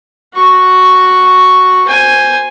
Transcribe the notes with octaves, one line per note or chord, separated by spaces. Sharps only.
F#4 C#6
C5 G#5